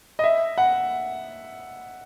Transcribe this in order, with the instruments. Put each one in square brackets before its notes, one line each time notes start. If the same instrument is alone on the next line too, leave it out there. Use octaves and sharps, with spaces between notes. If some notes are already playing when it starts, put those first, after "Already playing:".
[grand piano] D#5
E5
F#5